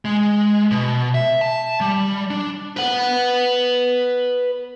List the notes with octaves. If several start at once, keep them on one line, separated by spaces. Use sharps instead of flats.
G#3
B2
E5
A5
G3
D4
B4 F#5